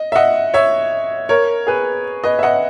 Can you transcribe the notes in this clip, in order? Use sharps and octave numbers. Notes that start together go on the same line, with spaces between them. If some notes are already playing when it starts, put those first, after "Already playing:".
Already playing: D#5
E5
D#5 F#5
C#5 E5
A#4 C#5
G#4 B4
B4 D#5
E5
D#5 F#5